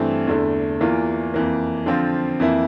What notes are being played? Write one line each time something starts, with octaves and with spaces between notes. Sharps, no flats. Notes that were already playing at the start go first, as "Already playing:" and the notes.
Already playing: G2 E3 A3 C4
E2 D3 A3
E2 E3 A#3 F4
F2 E3 A#3
D3 F3 C4 F4
F2 E3 A#3 E4